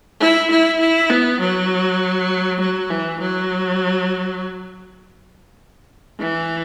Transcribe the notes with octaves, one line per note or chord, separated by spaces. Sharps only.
E4
E4
E4
B3
F#3
F#3
E3
F#3
E3